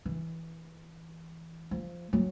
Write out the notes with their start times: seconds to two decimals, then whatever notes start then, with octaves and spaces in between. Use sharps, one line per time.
0.05 E3
1.71 F3
2.13 F#3